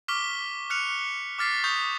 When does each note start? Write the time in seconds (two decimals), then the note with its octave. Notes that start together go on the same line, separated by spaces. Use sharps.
0.08 C#6 D6 F6 B6 G7
0.70 F6 F#6 C#7 F7
1.39 D6 F6 A6 B6 C7
1.64 C#6 D#6 G6